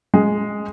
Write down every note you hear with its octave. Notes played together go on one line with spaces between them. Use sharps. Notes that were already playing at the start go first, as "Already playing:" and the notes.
G#3